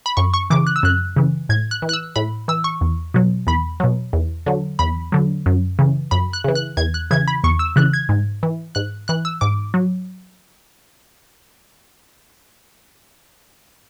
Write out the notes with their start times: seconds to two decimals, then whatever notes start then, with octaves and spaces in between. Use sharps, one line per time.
0.06 B5
0.17 F#2 C#6
0.34 C#6
0.50 C#3 E3 D6
0.67 F#6
0.76 E6
0.83 F#2 F#6
1.16 C#3 E3
1.49 A2 G#6
1.71 F#6
1.82 E3
1.89 F#6
1.93 E6
2.16 A2 B5
2.48 E3 E6
2.64 C#6
2.81 E2
3.14 B2 F#3
3.47 E2 B5
3.80 B2 F#3
4.13 E2
4.46 D3 F#3
4.79 E2 B5
5.12 D3 F#3
5.46 F#2
5.79 C#3 E3
6.11 F#2 B5
6.33 F#6
6.44 C#3 E3
6.55 F#6
6.77 E2 G#6
6.94 F#6
7.11 C#3 E3 G#6
7.28 B5
7.44 E2 C#6
7.59 E6
7.76 C#3 E3 F#6
7.93 G#6
8.09 G#2
8.43 E3
8.75 G#2 F#6
9.08 E3 F#6
9.25 E6
9.41 G#2 D6
9.74 F#3